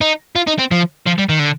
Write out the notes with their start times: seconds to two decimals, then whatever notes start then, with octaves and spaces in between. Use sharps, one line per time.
0.01 D#4
0.36 F4
0.47 D#4
0.59 C4
0.71 F3
1.06 F3
1.18 G3
1.29 D#3
1.39 D3